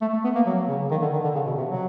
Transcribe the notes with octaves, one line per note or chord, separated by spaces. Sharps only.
A3
A3
B3
A#3
F#3
C#3
D#3
D3
D#3
D3
C#3
B2
C3
F#3